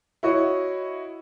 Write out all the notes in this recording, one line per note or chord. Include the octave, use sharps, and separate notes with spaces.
E4 F#4 C#5 D#5